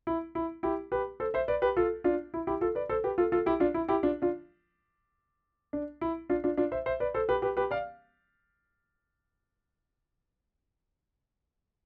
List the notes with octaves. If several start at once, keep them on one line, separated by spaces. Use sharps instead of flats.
E4
E4
E4 G4
G4 B4
A4 C5
C5 E5
B4 D5
G4 B4
F4 A4
D4 F4
E4
E4 G4
F4 A4
B4 D5
A4 C5
G4 B4
F4 A4
F4 A4
E4 G4
D4 F4
E4
E4 G4
D4 F4
D4 F4
D4
E4
D4 F4
D4 F4
D4 F4
C5 E5
C5 E5
B4 D5
A4 C5
G4 B4
G4 B4
G4 B4
D5 F5